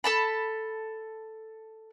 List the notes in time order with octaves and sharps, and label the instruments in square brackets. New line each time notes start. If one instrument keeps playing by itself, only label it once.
[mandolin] A4 A5 B5